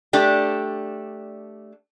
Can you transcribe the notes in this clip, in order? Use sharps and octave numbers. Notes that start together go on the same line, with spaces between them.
A3 D4 G4